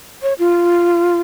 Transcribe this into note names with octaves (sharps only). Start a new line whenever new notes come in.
C#5
F4